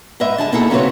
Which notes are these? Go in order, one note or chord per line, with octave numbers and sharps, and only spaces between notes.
G#2 B4 D#5 E5
D3 G#4 A5
B2 A#3 D#4 E4 G#4 A4
C#3 F#3 C4 F#4 B4 C#5